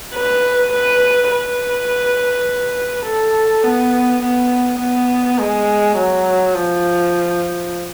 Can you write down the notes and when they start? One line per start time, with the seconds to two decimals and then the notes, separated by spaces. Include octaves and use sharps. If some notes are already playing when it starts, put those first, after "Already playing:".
0.15 B4
0.73 B4
1.31 B4
3.05 A4
3.64 B3
4.23 B3
4.80 B3
5.39 G#3
5.97 F#3
6.55 F3